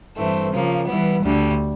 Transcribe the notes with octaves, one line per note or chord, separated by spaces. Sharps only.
G2 E3 A3 C4
C#3 F3 A#3
E3 G3 B3
D2 D3 G3